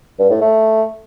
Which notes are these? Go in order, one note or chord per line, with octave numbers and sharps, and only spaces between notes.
G2
A2
A3